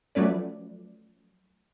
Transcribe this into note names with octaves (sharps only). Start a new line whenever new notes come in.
F3 F#3 A3 C#4 B4 D5